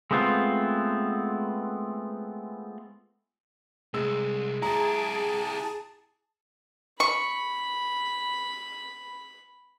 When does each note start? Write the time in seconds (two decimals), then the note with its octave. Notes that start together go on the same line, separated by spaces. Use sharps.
0.11 G#3 A3 B3 C4 F4
3.94 C2 G#3 E6
4.62 E4 G4 G#4 A5 A#5
7.00 B5 C#6